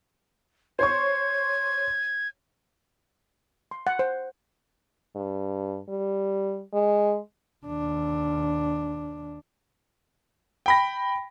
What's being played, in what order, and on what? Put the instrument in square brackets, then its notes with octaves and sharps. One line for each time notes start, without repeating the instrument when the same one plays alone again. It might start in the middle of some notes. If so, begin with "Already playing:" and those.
[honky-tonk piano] C5 C#5 C#6 [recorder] G#6
[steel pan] C6
F#5
C5
[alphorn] G2
G3
G#3
[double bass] D#2 D4
[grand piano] G5 B5 A#6